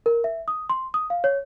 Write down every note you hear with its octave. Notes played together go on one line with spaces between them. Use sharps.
A#4
E5
D#6
C6
D#6
F5
C#5